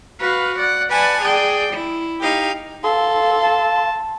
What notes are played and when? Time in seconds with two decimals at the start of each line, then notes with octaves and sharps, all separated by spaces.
0.20 F#4 B4 F5
0.58 D5 F#5
0.89 B4 D5 F#5 G#5 A5
1.22 G#4 D5 G5
1.72 E4
2.21 D#4 G4 F5
2.84 A4 F5 C6
3.43 A5